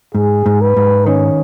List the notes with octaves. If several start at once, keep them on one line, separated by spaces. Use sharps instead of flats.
G#2 G#4
G#2
B4
G#2
D#3 C#4